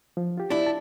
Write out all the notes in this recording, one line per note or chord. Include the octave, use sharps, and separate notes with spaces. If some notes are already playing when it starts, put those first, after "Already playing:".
F3
F4 G4
D4 E4
A5